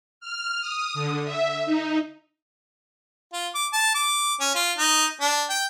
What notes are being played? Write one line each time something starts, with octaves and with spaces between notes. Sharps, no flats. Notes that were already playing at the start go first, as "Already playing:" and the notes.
F6
D#6
D3
E5
D#4
F4
D6
A5
D6
C#4
F4
D#4
D4
G5